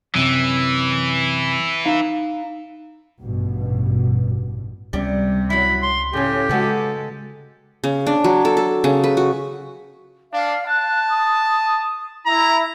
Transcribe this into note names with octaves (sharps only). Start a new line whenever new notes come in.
F#2 C3 E3
D#4 F5
A1 G2 B2
C#2 C3 G3 C4 C#4
F#3 E4 B5
C6
A2 C#3 C#4 G4
C#3 G#3 B3 F#4 A4
C#3
D4
F#3
A4
A4
C#3
B4
F#4
D4 F5
A5 F#6
D#6
E4 A#5